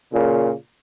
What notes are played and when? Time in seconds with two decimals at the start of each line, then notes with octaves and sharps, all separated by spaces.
0.13 A#2 C#3